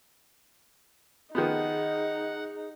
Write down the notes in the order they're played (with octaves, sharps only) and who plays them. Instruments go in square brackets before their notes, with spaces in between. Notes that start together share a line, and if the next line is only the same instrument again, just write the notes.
[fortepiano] D#3 F3 B3 [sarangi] D#4 [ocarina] G#4 [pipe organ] F#5